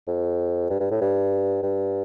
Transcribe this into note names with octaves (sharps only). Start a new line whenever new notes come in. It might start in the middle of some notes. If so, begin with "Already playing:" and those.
F2
G2
G2
A2
G2
G2